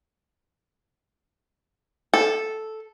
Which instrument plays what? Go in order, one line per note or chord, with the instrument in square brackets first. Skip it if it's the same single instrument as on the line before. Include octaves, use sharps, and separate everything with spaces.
[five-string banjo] A4